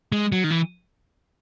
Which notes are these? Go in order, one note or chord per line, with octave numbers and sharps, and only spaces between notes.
G#3
F#3
D#3
E3